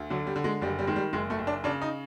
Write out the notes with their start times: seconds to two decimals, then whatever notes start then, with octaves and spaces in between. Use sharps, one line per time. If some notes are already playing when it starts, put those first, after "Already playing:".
Already playing: D2
0.10 D3 F#3
0.27 G3
0.36 D3
0.44 G#3
0.62 F#1 G3
0.79 G3
0.87 D#3 G#3
0.96 G3
1.13 F#1 G#3
1.30 A3
1.39 F#1
1.47 D4
1.64 C#3 D4
1.82 D#4